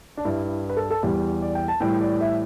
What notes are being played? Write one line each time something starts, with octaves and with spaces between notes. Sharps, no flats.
D4
G2 G3 E4
E4
B4
A4
A4
E2 E3 G3 G4
D5
G5
A5
A2 E3 G3 G5
D5
E5